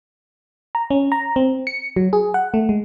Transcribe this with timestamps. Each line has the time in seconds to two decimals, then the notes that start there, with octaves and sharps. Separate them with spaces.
0.75 A#5
0.90 C#4
1.12 A#5
1.36 C4
1.67 C#7
1.96 F#3
2.13 G#4
2.34 F#5
2.54 A3
2.69 G#3